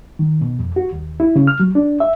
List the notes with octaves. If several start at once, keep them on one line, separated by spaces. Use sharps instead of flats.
D#3
B2
F2
F#4
D#2
E4
C#3
F6
F#3
D4
E5